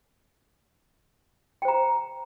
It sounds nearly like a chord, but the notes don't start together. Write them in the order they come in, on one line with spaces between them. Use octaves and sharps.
G5 C5 A#5